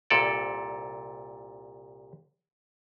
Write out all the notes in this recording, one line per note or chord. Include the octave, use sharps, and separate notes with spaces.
C2 A#2 A4 D5